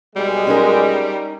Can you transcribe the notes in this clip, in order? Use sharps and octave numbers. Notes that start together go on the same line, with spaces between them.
B1 G3 G#3
C#4 D#4 A#4